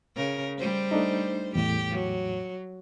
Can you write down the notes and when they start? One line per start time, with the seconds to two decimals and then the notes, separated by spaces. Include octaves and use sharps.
0.15 C#3 A#4
0.58 G3 C5
0.91 A3 D4 D#4
1.55 E2 A2 G4
1.90 F#3